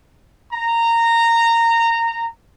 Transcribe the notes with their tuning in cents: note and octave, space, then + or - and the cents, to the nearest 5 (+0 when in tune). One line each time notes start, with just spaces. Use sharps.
A#5 -15